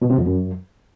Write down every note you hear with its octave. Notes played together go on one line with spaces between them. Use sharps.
B2
C3
F2
F#2